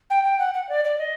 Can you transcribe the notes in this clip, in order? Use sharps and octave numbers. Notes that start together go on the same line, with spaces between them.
G5
G5
F#5
F#5
D5
D5
D#5